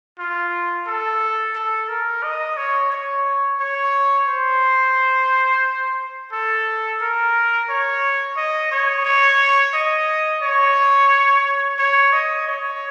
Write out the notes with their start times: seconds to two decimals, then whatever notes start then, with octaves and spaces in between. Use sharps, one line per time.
0.19 F4
0.87 A4
1.55 A4
1.89 A#4
2.23 D#5
2.57 C#5
2.92 C#5
3.60 C#5
4.28 C5
6.32 A4
7.02 A#4
7.70 C#5
8.37 D#5
8.71 C#5
9.05 C#5
9.74 D#5
10.42 C#5
11.79 C#5
12.13 D#5
12.48 C#5